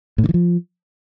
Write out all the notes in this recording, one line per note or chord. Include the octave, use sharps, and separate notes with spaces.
A2
D3
E3
F3